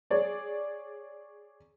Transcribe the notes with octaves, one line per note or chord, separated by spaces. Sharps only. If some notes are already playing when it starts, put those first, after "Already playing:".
G#4 C#5 D5